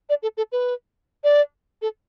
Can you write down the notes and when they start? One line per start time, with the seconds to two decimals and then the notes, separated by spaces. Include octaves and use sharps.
0.09 D5
0.23 A4
0.37 A4
0.52 B4
1.24 D5
1.82 A4